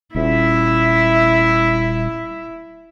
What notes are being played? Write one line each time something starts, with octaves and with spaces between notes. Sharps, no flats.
D#1 E4 E5